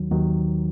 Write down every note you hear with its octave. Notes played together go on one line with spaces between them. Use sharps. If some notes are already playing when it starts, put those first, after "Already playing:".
Already playing: D#2 D#3 F#3
D#2 D#3 F#3